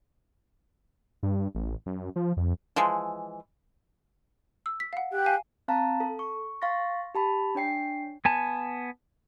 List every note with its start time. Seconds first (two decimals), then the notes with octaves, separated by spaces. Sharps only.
1.23 G2
1.55 A1
1.86 F#2
2.16 F3
2.37 F2
2.76 E3 F3 G#3
4.66 E6
4.80 B6
4.93 F5 F#5
5.13 G4 G5 F#6
5.26 F5 G#5
5.68 C4 F5 A5 A#5
6.00 A4
6.19 C#6
6.62 F5 C6 C#6 A6 A#6
7.15 G4 A5 B5
7.55 D4 C#5 G5 C7
8.25 B3 G#5 A5